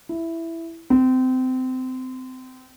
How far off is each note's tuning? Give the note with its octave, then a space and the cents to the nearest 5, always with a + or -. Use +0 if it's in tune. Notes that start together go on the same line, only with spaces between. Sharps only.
E4 +5
C4 -25